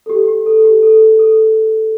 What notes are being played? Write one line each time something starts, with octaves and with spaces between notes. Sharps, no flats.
A4
G4
G4
A4
G4
A4
A4